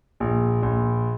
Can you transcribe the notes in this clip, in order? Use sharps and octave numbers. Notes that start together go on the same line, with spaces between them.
A#1
A#1